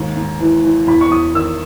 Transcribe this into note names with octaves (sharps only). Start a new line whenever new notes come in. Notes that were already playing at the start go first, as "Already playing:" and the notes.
Already playing: D#2 G#2
G#2
E3
E3
E2 B5
C#6
E2 D#6
D#3 E6